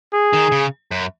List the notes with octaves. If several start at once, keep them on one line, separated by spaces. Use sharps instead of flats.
G#4
D#3
C#3
F#2